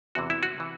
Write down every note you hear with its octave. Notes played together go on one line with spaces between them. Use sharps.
E2 C3 E3 F#4
E4
F#4
C3 E3